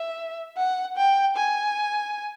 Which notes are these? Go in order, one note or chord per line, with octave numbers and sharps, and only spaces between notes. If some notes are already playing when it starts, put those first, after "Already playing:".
Already playing: E5
F#5
G5
G#5